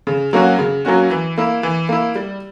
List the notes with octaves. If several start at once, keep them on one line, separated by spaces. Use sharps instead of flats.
C#3
F#3 A#3 C#4 F#4
C#3
F#3 A#3 C#4 F#4
E3
A#3 E4
E3
A#3 E4
G3